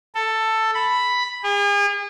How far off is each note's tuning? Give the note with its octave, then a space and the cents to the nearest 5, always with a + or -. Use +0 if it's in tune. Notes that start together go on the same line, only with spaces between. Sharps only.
A4 +10
B5 +0
G#4 -40